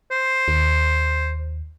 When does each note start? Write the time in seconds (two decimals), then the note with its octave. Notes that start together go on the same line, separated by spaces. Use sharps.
0.11 C5
0.48 D#2